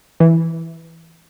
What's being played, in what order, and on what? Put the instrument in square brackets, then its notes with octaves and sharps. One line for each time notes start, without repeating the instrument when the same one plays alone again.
[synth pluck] E3